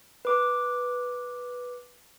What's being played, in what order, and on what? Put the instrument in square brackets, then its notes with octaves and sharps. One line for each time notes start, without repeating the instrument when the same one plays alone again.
[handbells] B4 D6